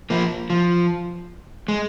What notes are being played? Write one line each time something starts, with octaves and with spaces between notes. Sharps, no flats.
F3 A#3
F3
G#3